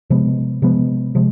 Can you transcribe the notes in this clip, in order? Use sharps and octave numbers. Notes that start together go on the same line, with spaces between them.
C3 F3 G#3 B3
C3 F3 G#3 B3
C3 F3 G#3